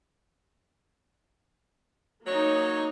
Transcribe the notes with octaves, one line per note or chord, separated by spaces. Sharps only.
F#3 A#3 D#4 C#5